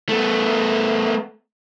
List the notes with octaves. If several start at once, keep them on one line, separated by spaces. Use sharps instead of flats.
A3 B3